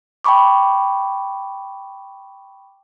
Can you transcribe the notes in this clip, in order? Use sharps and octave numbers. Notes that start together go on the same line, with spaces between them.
G5 A5 B5 C#6 D6